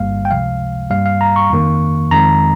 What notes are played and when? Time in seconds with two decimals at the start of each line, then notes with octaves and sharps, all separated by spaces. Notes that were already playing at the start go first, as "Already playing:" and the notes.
Already playing: G1 G2 G3 A#3 F5
0.25 G5
0.31 C#2 C3 F3 G#3 F5
0.90 G2 G3 A#3 F5
1.06 F5
1.21 A#5
1.36 C#6
1.50 F2 D#3 A#3
2.11 F2 D#3 G#3 A#5